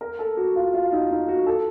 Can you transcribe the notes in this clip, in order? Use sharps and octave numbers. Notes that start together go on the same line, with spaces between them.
A#4
A4
F#4
F4
F4
D#4
D#4
F#4
A4